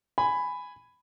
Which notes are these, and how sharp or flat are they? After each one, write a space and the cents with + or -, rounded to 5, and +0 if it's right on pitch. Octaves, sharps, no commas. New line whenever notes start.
G#5 +0 B5 +10